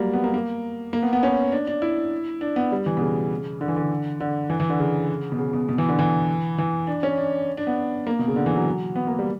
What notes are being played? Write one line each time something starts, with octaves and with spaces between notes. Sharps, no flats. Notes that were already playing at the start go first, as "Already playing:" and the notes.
Already playing: F#3 G3 A#3
B3
A#3
A#3
A#3
B3
B3
C#4
D4
D4
E4
D4
B3
G3
E3
B2
C#3
D3
E3
D3
D3
E3
E3
D3
C#3
B2
C#3
B2
B2
E3
D3
E3
E3
D4
C#4
D4
D4
B3
A#3
B2
C#3
D3
E3
F#3
B3
A#3
G3